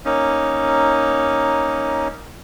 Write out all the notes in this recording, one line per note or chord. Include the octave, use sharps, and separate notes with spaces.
A#3 C#4 D#4